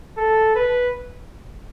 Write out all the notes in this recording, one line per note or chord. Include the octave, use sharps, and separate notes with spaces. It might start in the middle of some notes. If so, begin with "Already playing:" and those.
A4
B4